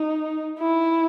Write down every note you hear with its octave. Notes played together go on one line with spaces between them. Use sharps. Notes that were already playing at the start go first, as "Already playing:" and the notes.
Already playing: D#4
E4